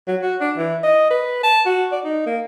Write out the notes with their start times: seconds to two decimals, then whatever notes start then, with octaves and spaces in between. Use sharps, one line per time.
0.08 F#3
0.22 F#4
0.41 D4
0.57 E3
0.84 D#5
1.11 B4
1.43 A5
1.66 F#4
1.92 D5
2.04 D#4
2.26 A#3